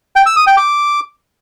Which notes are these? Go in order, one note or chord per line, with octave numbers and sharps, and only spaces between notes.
G5
E6
D#6
G5
D6